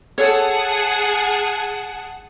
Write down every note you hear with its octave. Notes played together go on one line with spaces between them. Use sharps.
G#4 A4 C#5 F#5 A5